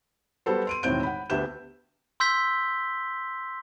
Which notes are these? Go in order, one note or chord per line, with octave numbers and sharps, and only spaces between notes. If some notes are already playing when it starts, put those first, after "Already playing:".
G3 B3 F#4 A4 C5
C6 D7 D#7
E1 A2 D#3 C4 G6 D7
F#5 B5
D2 B3 G4 E5 G6 E7
C6 E6 G6 B6 G7